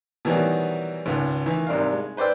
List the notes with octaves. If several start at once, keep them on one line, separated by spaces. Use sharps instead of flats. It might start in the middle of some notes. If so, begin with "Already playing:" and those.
B2 D#3 E3 F#3 G3
G#1 C#2
D#3 E3
G#1 C3 G3 D4 A#4 F5
G#3
B4 C5 D5 G5 E6